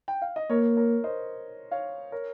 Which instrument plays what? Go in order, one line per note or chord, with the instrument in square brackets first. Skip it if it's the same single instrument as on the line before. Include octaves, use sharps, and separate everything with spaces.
[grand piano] G5
F5
D#5
[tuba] A#3 [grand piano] A#4 C#5
[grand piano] A#4 C#5
C5 D#5
C#5 F5
A#4 C#5